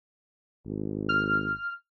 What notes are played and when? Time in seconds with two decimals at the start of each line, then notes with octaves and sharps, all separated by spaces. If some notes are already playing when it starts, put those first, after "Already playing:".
0.66 G#1
1.09 F6